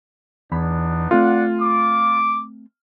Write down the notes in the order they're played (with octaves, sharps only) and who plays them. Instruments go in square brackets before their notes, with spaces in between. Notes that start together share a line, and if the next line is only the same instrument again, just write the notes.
[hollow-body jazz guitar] E2 B5 [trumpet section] B3 D4 D#4
[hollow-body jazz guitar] A3 C4 A4 [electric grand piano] F4 [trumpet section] D5 F#5
[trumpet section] D6